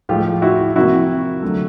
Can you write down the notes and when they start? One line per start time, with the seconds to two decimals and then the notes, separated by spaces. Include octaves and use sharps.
0.09 A2 F3 G#3 F4 G4
0.42 E4 F#4
0.76 C3 F3 A#3 E4 F#4
1.42 D3 F#3 A3